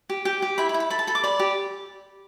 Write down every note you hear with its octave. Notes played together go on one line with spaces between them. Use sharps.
G4
G4 G5
G4
E4 B5
B5
E4
B5
A4 B5
A5
A4 B5
D6
D5 B5
G4